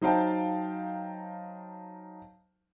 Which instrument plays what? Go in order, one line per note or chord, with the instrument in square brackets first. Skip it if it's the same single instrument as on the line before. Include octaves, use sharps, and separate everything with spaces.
[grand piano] F#3 D#4 C5 F5 G5 A5